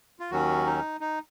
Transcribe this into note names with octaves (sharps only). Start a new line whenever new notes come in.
F4
D#2 D#3 F#3 C#4 F#4
D#4
D#4